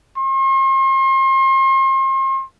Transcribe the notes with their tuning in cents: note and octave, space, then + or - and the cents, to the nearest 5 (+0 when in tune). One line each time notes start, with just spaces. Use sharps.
C6 +40